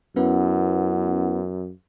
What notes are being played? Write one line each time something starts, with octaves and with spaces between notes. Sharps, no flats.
F#2 B3 C#4 E4 B4 F#5